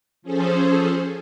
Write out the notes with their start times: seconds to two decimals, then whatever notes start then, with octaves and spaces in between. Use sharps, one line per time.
0.22 F3 C#4 G#4 A4 C5